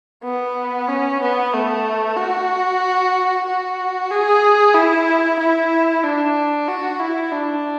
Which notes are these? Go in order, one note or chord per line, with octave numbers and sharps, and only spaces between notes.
B3
C#4
B3
A3
F#4
F#4
G#4
E4
E4
D4
F#4
E4
D4